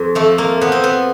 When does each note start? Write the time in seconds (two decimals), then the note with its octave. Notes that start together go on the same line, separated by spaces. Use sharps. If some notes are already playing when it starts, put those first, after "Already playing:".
Already playing: F2
0.15 F3 A3
0.38 A#3
0.61 F3 B3
0.72 C4
0.84 B3